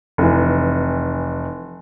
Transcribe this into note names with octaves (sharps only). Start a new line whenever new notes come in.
F1 E3